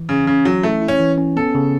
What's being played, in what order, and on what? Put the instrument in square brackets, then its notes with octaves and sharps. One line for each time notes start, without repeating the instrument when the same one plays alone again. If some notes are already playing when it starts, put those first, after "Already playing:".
Already playing: [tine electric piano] E3
[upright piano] C#3 [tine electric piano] C#4
[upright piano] C#3 [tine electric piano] C#4
[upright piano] F#3 [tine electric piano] C#4
[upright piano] A3 [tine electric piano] E4
[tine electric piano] E4
[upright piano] C#4
[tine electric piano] E3
C#4
[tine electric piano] B3 [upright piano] A4
[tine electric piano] C#3